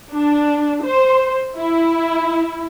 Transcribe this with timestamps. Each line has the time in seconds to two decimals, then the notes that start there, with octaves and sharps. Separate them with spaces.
0.13 D4
0.85 C5
1.56 E4